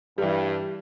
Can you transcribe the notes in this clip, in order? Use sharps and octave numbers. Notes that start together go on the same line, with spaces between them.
G2 E3 G3